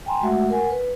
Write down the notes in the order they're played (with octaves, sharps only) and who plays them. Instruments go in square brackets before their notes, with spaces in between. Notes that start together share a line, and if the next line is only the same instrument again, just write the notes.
[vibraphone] G5 G#5 A#5 C6
G#3 A3 F#4 E5 F#5
A#4 F#5 G#5
B4